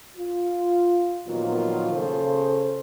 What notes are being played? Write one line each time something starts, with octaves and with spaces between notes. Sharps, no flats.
F4
A#2 D#3 F3 F#3 B3 F4
C#3 A4 C5